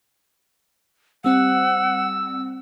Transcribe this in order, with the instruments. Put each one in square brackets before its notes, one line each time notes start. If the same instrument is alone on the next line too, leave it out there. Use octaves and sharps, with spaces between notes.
[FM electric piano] G3 C4 [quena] F#5 [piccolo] E6